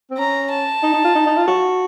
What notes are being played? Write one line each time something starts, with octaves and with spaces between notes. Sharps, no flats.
C4
C#4 A#5
A5
D#4
D#4
F4
D#4
D#4
F4
F#4